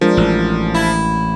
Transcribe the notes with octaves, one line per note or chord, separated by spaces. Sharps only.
F3 G#3 D4 A#4
A1
E4